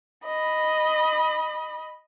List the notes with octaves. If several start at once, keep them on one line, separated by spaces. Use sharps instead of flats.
D#5 B5